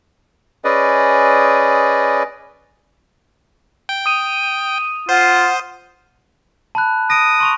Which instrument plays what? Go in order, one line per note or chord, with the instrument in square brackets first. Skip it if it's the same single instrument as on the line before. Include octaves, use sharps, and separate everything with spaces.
[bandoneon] C#4 G#4 B4 D5 D#5
[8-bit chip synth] G5
[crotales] D#6 D#7
[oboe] F4 [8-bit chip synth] C5 [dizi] F#5
[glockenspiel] A5 B5 F#6
[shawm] D#6 [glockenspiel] A#6 D7
[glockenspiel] C6 C#6 F7